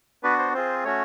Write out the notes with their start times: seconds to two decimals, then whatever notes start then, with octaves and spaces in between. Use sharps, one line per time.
0.23 B3 D4 F#4 B4
0.38 C5
0.54 C4 F4 G#4 C5
0.84 A3 C#4 F#4 C#5